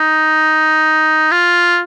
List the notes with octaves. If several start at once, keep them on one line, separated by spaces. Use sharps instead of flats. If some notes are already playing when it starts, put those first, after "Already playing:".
Already playing: D#4
F4